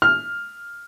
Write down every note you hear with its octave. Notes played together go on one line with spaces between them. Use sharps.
F6